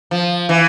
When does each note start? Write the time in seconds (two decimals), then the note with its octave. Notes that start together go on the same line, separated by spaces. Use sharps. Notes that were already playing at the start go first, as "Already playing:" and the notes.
0.11 F3
0.49 E3